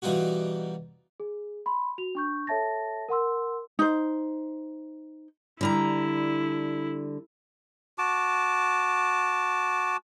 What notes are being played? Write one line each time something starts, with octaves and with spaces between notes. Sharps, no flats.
B2 E3 G3 D#4 F4 F#4
G#4
B5 C6
F#4 F7
D4 C#6 G6
A4 C#5 E5 A5 A6 A#6
A#4 F#5 C6 E6
D#4 C5
D3 G3 E4 A#5
F#4 A5 D6